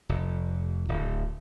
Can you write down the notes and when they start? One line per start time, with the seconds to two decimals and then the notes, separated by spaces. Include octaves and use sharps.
0.09 F1
0.88 D1